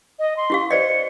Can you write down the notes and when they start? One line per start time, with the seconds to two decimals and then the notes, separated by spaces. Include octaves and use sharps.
0.19 D#5
0.37 C6
0.50 E4 G4 F5
0.71 C5 D5 D#5 C#7